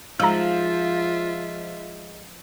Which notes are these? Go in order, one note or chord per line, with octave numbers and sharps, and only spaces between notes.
F3 G#3 D#4 F4 E5 A#5 E6